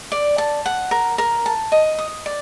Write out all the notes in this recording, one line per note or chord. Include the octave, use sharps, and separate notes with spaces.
D5
A5
F#5
A#4
A#4
A5
D#5
D#6
D5